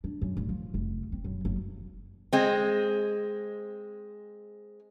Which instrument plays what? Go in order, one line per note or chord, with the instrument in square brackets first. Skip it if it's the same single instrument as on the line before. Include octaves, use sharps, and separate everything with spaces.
[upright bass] D4
F#2
D1
F3
F1
C4
F#2
F#1
[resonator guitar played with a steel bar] G#3 C4